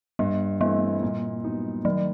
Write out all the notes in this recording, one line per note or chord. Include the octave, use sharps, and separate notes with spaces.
G2 G3
E3 G3 A3 C4 E4
A#2
F#3 B3 D#4
D#3 F#3